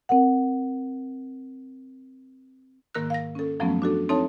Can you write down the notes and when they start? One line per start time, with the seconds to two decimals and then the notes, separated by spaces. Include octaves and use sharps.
0.09 C4 A#4 F#5
2.95 G#2 D#3 A#3 A#4 E6 F#6
3.10 F5 A#6
3.35 C#4 A4
3.60 F#2 F3 F#3 A3 B3 C#4
3.82 D4 F#4 A4
4.09 C4 D#4 A4 C#5 E5 A5